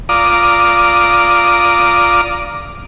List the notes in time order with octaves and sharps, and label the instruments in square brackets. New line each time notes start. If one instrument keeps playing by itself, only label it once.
[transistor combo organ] F4 D5 A#5 D6 D#6